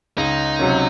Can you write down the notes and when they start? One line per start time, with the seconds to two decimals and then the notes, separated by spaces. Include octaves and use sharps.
0.17 C#2 D#4
0.59 C3 F#3 C#4